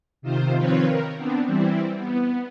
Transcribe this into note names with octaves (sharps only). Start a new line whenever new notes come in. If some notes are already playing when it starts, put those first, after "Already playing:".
C3 D#3 F4 C5
D#3 F3 C4 F4 B4 C#5
A#4
B3 C4 D4
E3 G3 C4 E4
B3